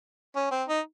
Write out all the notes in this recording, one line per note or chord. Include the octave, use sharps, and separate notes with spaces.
C#4
C4
D#4